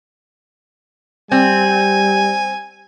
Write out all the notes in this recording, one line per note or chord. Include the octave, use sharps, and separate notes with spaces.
G3 C4 G#5